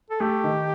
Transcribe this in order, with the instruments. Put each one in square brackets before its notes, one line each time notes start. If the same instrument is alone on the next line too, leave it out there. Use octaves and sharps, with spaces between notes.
[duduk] A4
[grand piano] A3 [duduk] G4
[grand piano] D#3